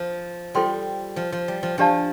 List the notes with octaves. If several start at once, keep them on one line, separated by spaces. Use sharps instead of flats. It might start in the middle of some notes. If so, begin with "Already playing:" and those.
Already playing: F3
G3 F4 A4 C5 G5 C6
F3
F3
G3
F3
F3 D4 G4 D5 F5 A5